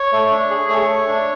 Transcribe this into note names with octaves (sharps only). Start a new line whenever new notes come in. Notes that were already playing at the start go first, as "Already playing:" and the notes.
Already playing: C#5
A3
D4
G#4
A3 C#5
A3
D4